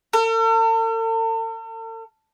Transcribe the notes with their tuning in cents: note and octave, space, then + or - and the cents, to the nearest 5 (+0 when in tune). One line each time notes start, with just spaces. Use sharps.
A4 +45